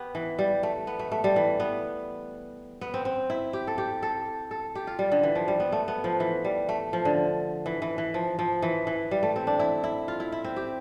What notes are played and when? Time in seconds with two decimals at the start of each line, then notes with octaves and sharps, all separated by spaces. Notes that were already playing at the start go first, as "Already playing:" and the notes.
Already playing: B3 G4
0.15 E3
0.39 G3
0.63 A3
0.87 B3
0.99 A3
1.12 A3
1.24 G3
1.36 E3
1.60 B3
2.81 B3
2.94 C4
3.05 C4
3.30 E4
3.53 G4
3.67 A4
3.78 G4
4.03 A4
4.51 A4
4.75 G4
4.87 F4
4.99 G3
5.12 D3
5.23 E3
5.35 F3
5.48 G3
5.60 B3
5.72 A3
5.88 B3
6.04 F3
6.20 E3
6.44 G3
6.69 A3
6.93 F3
7.05 D3
7.66 E3
7.82 E3
7.98 E3
8.14 F3
8.39 F3
8.62 E3
8.87 E3
9.11 G3
9.23 A3
9.36 C4
9.47 D4
9.59 E4
9.84 E4
10.08 F4
10.20 E4
10.32 E4
10.44 C4
10.56 G4